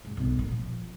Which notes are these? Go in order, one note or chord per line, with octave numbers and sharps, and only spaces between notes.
G#2
B1 G3
A#2 D#3
F3